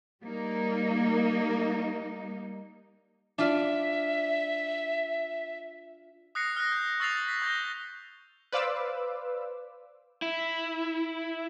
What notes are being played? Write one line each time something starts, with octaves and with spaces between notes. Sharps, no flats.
G3 A#3 D#4
D4 F4 D5 E5
D#6 F#6 A#6 C7 C#7
F6 F#6 A#6
G6
C#6 E6 A6 C7 F7
B6
C#6 G6 A#6 G7
B4 C5 D5 F5 D6 E6
E4